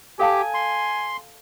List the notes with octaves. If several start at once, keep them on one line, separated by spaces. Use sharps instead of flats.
G4 A4 F5 G#5 A5
C6